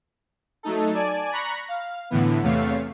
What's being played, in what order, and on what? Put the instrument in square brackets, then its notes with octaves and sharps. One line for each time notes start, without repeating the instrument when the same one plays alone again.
[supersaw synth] F#3 A3 D#4 A4
D5 G#5 A5
A#5 B5 C#6 F#6 A#6
F5
A2 D3 E3 B3
E2 C3 A3 C#5 F5 C7